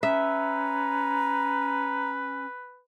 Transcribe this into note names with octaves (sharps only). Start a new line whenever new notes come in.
C#4 B4 E5 A#5